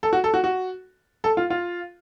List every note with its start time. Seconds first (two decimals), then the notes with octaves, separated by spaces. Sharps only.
0.03 A4
0.13 F#4
0.24 A4
0.34 F#4
0.44 F#4
1.24 A4
1.37 F4
1.50 F4